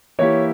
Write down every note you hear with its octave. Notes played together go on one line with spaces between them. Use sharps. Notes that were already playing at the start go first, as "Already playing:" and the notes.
E3 A#3 E4 G4 C#5